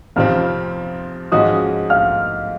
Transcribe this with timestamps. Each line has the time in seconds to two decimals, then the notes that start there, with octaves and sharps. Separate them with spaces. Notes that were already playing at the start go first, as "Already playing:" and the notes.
0.16 F2 C3 F3 C4 F5 F6
1.32 G#2 F3 G#3 C#4 F#4 D#5 D#6
1.90 F5 F6